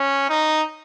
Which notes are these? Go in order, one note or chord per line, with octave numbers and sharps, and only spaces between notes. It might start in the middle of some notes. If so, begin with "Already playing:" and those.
Already playing: C#4
D#4